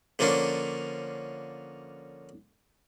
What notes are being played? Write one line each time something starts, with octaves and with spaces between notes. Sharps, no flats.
D3 F3 A#3 C#4 D4